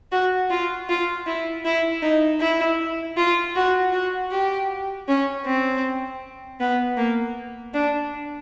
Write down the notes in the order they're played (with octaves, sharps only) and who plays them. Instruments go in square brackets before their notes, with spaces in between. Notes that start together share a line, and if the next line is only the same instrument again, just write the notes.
[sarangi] F#4
F4
F4
E4
E4
D#4
E4
F4
F#4
F#4
G4
C#4
C4
B3
A#3
D4